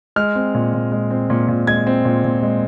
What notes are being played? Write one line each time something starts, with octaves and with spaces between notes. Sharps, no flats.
G#3 F6
C4
A#2
A#2
G#3
C4
A#2
A#2
G#3 G#6
C4
A#2
A#2
G#3